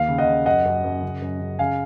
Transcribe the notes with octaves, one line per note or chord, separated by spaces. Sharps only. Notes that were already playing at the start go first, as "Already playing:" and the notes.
Already playing: D#2 F5
C#3
D#5 F#5
C#3
F#2 D#5 F#5
F#2
F#2
C#3
F#2
C#3
C#3 F5 G#5